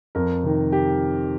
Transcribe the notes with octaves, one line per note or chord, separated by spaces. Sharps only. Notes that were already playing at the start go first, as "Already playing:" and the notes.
F2 A#4
C3 D#3
G4